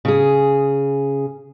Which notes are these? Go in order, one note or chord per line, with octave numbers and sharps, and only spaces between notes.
C#3 G#4